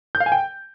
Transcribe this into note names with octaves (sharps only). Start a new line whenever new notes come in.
G6
F5
G#5
G5